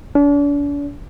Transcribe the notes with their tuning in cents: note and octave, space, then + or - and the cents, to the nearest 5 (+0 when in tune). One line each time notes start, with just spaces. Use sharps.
D4 -40